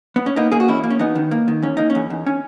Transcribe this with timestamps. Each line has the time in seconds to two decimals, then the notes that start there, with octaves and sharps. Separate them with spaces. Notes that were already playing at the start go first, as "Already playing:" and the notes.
0.16 B3
0.26 C#4
0.36 A#3 B3 D#4
0.52 A#3 G#4
0.60 F#4
0.68 E2 C#4 E4
0.84 A#3
0.90 C#4
0.99 E2 B3 D#4
1.15 D#3
1.31 A#3
1.48 D#3
1.63 E2 C#4
1.77 A#3 D#4
1.90 C#4
1.95 E2
2.10 E2
2.26 C#4